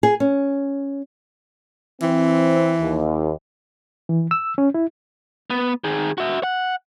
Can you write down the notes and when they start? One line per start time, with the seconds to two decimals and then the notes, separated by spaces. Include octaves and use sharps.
0.03 G#4
0.20 C#4
2.02 E3 C4
2.81 D#2
4.09 E3
4.31 E6
4.58 C#4
4.74 E4
5.50 B3
5.84 D#3 G#4
6.18 F#4 E5
6.43 F#5